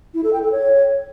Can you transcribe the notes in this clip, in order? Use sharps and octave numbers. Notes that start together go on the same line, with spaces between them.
E4
A4
G5
A4
C#5